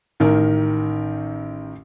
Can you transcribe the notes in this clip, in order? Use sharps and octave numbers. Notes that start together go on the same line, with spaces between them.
A1 D#3 A#4